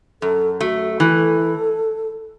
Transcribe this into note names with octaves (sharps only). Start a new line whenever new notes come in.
F#2 A4
A3 F#4
E3 A4